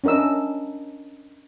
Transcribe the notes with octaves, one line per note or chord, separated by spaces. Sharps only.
C#4 D4 A#4 D#5 E6